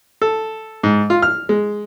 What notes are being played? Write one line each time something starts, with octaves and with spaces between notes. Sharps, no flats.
A4
G#2
F4
F6
G#3